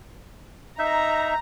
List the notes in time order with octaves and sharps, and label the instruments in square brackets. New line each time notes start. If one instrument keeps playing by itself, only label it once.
[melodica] D#4 E5 [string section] A#5